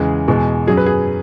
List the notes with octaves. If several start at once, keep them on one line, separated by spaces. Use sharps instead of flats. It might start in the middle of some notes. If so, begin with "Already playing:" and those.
Already playing: E2 C#3 G#3 G#4
E2 B2 G#3
F#2 F#3 G#4
B4
G#4